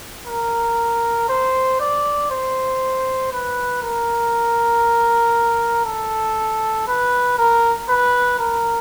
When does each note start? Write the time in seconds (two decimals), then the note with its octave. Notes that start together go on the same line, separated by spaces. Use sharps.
0.27 A#4
1.29 C5
1.80 D5
2.31 C5
3.32 B4
3.82 A#4
5.85 A4
6.87 B4
7.38 A#4
7.89 B4
8.39 A#4